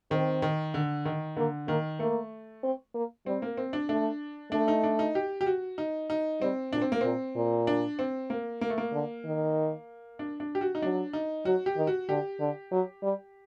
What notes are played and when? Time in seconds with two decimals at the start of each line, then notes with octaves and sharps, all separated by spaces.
0.11 D#3 C4
0.42 D#3
0.74 D3
1.05 D#3
1.36 D3 A#3
1.68 D#3 A#3
1.99 A3 A#3
2.63 C4
2.94 A#3
3.26 G3 C4
3.42 A#3
3.57 C4
3.73 D4
3.89 A3 D4
4.52 A3 D4
4.68 D#4
4.83 D4
4.99 D#4
5.15 G4
5.41 G4
5.46 F#4
5.78 D#4
6.10 D#4
6.41 G3 C4
6.73 A#2 D4
6.82 C4
6.92 A#3
7.01 A#2 C4
7.36 A#2
7.67 D4
7.99 C4
8.30 A#3
8.61 A#3
8.70 A3
8.78 A#3
8.93 D3
9.25 D#3
10.19 D4
10.40 D4
10.55 G4
10.61 F#4
10.75 D#4
10.82 F#3 D4
11.13 D#4
11.45 F#3 F#4
11.66 G4
11.77 D#3
11.87 F#4
12.09 D3 G4
12.40 D3
12.71 F#3
13.02 G3